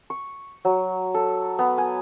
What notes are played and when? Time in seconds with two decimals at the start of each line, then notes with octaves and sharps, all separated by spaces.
0.10 C#6
0.65 F#3
1.14 A4
1.59 B3
1.78 G#5